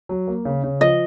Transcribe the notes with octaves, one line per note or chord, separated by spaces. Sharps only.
F#3
A#3
C#3
C#3
F3 D#5